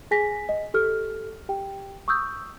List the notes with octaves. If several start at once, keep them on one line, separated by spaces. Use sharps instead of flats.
G#4 G#5 A#6 B6
D#5
G4 A4 F6
G4 G5
C#6 D#6 E6 G6